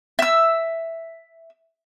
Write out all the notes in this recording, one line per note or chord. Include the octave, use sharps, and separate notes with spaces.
E5 E6